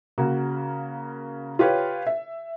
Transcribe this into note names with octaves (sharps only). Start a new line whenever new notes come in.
C#3 A#3 F#4
F4 G4 B4 C#5
E5